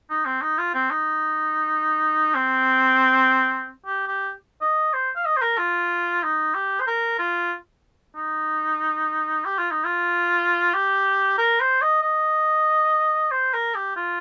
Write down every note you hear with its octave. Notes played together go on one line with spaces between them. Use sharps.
D#4
C4
D#4
F4
C4
D#4
C4
G4
G4
D#5
C5
F5
D#5
C5
A#4
F4
D#4
G4
C5
A#4
F4
D#4
G4
F4
D#4
F4
G4
A#4
C5
D#5
D#5
C5
A#4
G4
F4